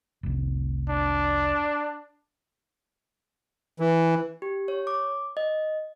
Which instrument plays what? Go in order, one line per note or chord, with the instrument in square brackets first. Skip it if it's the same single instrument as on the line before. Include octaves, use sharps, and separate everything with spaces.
[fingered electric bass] F1 C2
[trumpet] D4
[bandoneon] E3
[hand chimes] G4
C#5
D6
D#5